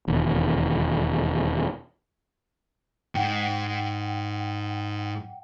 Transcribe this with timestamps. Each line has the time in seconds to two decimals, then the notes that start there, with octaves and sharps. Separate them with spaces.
0.08 E1 D#2
3.15 G#2 F#5 G5